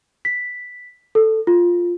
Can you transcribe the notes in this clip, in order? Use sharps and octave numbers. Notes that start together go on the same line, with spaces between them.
B6
A4
F4